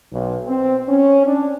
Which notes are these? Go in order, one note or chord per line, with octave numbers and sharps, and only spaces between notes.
B1
C4
C#4
D4